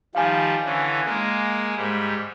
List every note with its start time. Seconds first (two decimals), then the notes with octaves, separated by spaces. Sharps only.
0.15 D#3 F3 G3 F5 G#5
0.65 D3 E3 C#4
1.06 G#3 A#3
1.76 G#2 G3